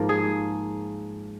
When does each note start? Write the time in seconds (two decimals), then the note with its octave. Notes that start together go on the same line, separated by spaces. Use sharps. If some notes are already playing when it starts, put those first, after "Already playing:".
Already playing: G#2 F3 A#3 A#4
0.09 G#4